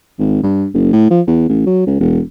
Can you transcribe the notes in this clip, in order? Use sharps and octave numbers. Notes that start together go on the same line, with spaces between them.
G#1
G2
F#1
A2
F3
E2
A1
F#3
C#2
E1